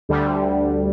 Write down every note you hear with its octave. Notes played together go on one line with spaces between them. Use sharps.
D2 D3 G3